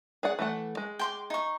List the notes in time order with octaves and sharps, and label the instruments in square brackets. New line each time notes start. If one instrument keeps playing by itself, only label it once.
[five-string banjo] G#4 D5 F#5
E3 A3 F#5
G#3
[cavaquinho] G5 C6 D6
D#4 C#6